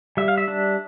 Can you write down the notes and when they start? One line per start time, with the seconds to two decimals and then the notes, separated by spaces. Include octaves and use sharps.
0.17 G3 E5
0.28 F5
0.38 E5
0.48 D4